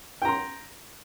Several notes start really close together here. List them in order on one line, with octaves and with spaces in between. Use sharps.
G5 A#5 C6